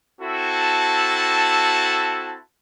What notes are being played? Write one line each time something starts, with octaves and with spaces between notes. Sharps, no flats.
C4 E4 F#4 A4 A5